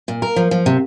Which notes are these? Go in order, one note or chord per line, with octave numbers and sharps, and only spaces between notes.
A#2
A#4
F3
F3
C3